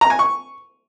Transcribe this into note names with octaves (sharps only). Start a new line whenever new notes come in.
A#5
G#5
C#6